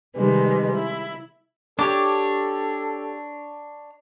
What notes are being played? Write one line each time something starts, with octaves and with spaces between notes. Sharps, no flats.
C3 D#3 G3 G#3 B4
E4
D4 G4 A4 C#5 D6